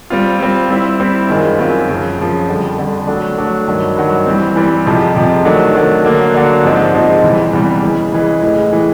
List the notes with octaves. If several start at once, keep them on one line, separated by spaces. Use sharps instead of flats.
G3 C4 F4
G3 C4 F4
G3 C4 E4
G3 C4 E4
F#2 D#3 G#3 C4 F4
F#2 D#3 G#3 C4 F4
F#2 C#3 F3
F#2 C#3 F3
F2 D3 G3
F2 D3 G3
F#3 A3 D4
F#3 A3 D4
G2 D#3 F#3
G2 D#3 F#3
E3 G3 C4
E3 G3 C4
F2 C3 F3 G#3
F2 C3 F3 G#3
D#3 F#3 A3 D4
D#3 F#3 A3 D4
D3 F#3 A#3 D4
D3 F#3 A#3 D4
G#2 F3 G#3 C4 D#4
G#2 F3 G#3 C4 D#4
E2 C3 E3 G3
E2 C3 E3 G3
C#3 E3 G#3
C#3 E3 G#3
A2 E3 G#3
A2 E3 G#3